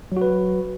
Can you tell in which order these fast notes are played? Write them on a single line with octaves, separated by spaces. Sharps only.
F#3 F#4 B4